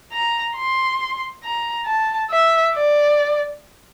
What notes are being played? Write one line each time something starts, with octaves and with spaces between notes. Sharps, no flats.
A#5
C6
A#5
A5
E5
D5